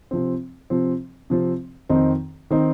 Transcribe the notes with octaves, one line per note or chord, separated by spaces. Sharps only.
C3 F3 C4
C3 F3 C4
C3 F3 C4
F2 D#3 C4 D#4
D#3 C4 D#4